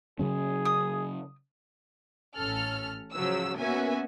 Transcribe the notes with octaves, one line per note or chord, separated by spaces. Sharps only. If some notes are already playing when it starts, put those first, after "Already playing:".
C#3 F#3 C#4 G#4
D#6
A1 C#4 A4 F6
C#3 F3 F#3 E6
A#3 B3 C#4 F#4 E5 G#5